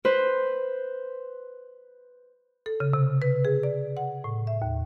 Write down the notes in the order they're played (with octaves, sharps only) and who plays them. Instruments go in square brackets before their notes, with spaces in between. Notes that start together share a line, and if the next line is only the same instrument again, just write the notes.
[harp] B4 C5
[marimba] A4
C#3
C3
B4
G#4
D5
F#5
A2
E5
D#2